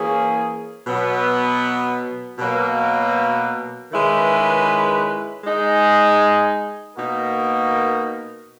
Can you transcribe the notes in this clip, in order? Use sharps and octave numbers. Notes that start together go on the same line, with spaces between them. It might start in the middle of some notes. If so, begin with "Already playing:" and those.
Already playing: E3 A#3 C#4 G#4
B2 F#3 B3
B2 F#3 A#3
D#3 G#3 C#4 E4 B4
G#3 D#4 G#4
B2 A#3 D#4 F#4 A#4